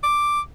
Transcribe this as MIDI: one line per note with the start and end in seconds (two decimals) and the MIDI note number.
0.04 0.41 86